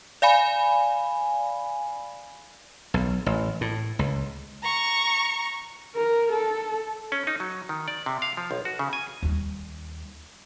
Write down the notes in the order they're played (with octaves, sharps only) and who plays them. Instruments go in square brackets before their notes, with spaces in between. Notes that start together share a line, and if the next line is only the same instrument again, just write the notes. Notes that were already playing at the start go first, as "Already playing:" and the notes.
[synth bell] D5 F5 G#5 B5
[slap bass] B1
A1
A2
C#2
[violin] A#5 C#6
[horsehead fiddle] A#4
A4
[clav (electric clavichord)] C#4
D#4
F#3
D#3
D5
C3
F5
F3
B1
F#4
C#3
G#5
[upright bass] D#2 G3